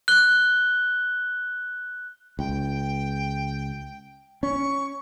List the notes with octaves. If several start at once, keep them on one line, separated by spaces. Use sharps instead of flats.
F#6 G7
C#2 G5
C#4 C#6